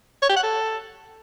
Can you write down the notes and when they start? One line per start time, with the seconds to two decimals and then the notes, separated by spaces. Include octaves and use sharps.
0.22 C#5
0.29 G4
0.36 F#5
0.43 A4